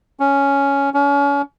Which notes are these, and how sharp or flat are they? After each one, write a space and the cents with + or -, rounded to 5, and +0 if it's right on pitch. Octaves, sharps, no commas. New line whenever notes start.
C#4 +5
C#4 +35